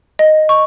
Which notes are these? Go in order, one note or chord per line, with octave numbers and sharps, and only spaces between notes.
D#5
C#6